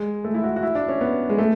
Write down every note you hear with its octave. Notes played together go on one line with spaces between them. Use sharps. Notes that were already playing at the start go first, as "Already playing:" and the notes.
Already playing: G#3
A3
E4
F#4
F#4
E4
D4
C#4
B3
G#3
A3